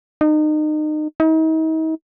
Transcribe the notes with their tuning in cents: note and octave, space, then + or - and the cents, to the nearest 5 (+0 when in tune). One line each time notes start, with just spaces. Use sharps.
D#4 -30
D#4 +40